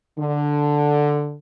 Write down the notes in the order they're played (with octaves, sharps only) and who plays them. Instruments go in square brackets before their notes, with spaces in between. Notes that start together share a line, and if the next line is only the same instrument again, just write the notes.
[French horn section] D3